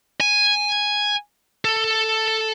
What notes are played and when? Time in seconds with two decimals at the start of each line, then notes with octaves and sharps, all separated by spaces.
0.20 G#5
1.65 A4